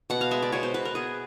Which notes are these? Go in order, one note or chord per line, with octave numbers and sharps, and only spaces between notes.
B2 F#5
F5
G#3 E5
D5
B2 C#5
C5
B2 B4
A#4
B3 G#4